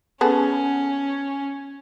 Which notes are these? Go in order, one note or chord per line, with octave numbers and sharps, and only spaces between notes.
B3 C#4 G#4 A4